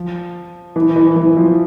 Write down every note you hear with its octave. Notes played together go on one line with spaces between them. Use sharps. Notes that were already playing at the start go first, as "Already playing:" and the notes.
Already playing: F3
E3
E3
E3
F3